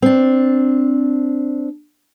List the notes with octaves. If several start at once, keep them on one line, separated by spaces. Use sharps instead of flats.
C4 D4